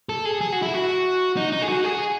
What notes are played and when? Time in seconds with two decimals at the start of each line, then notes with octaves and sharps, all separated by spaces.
0.09 A4
0.25 G#4
0.41 G#4
0.52 F#4
0.62 E4
0.74 F#4
1.37 D#4
1.52 D#4
1.62 G#4
1.69 F#4
1.84 G#4